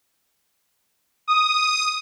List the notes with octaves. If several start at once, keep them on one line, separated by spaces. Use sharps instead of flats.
D#6